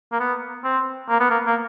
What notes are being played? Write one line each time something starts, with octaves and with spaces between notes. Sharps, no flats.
A#3
B3
C4
A#3
B3
A#3
A#3